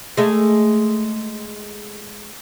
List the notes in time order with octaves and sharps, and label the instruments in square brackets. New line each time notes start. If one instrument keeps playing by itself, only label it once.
[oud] G#3 A3